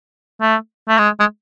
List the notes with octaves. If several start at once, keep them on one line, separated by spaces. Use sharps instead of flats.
A3
A3
G#3
G#3